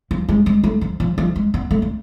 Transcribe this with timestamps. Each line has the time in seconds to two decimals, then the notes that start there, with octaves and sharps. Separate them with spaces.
0.11 F3
0.29 G#3
0.46 G#3
0.64 A3
0.81 F3
1.00 F3
1.18 F3
1.36 G#3
1.54 B3
1.71 A3
1.82 A3